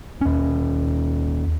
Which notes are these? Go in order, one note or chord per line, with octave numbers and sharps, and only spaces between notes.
D#2 C#4